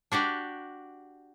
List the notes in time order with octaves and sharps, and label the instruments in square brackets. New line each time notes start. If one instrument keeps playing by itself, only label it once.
[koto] D4 F#4 G4 D5